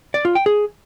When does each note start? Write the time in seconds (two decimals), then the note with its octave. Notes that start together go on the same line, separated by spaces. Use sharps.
0.14 D5
0.25 F4
0.35 G5
0.46 G#4